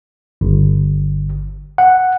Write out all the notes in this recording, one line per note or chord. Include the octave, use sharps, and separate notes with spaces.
G1
F#5